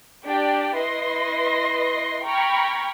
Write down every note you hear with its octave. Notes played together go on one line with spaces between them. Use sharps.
D4 G4 D5 G5
E4 B4 D#5 C6 A#6
G5 A#5 B5 C#6 F6 G#6